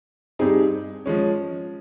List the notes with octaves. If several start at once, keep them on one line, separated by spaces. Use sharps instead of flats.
G2 G3 C4 D#4 G#4
F3 G#3 C#4